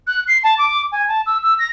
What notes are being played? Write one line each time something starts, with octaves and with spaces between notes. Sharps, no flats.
F#6
C7
A5
D6
G#5
A5
E6
E6
A#6